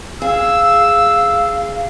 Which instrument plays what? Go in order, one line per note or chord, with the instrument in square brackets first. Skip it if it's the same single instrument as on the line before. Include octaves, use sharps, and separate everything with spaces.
[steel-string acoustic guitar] G#4 [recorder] F5 [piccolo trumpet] E6